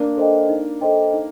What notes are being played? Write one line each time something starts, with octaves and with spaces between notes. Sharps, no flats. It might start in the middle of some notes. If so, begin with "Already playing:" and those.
Already playing: A#3 D4
A4 C5 D#5 G5
D#4
A4 C5 D#5 G5
D#4